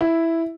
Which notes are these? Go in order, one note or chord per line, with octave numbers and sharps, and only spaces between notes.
E4